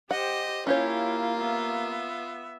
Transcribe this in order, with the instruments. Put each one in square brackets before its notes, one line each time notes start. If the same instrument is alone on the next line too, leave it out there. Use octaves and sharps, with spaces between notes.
[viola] G4 C5 [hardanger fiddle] D#5 [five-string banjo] F#5
[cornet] A#3 [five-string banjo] C#4 G4 C#5 [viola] E4 [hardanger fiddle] F4
[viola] B3 E5